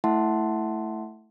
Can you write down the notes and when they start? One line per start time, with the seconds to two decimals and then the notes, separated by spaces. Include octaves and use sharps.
0.04 A3 E4 E5 F#5 A5 C6